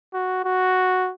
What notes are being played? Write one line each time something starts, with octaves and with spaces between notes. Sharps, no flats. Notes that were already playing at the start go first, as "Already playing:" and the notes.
F#4
F#4